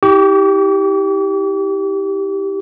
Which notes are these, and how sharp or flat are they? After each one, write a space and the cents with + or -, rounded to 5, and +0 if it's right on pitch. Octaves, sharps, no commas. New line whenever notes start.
E4 -40 G4 +0 D6 -45